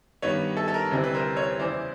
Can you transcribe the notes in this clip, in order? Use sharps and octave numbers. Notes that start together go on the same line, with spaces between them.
G2 D#3 G3 B3 B4 C#5
A4
A4
A#4
D2 C3 E3 G3 C4
B4
A#4 C5
B4 C#5
E2 C#3 E3 C5 D5